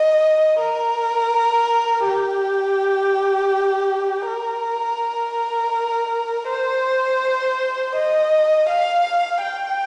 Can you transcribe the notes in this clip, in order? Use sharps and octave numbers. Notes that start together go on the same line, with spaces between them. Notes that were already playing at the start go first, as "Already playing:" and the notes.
Already playing: D#5
A#4
G4
A#4
C5
D#5
F5
G5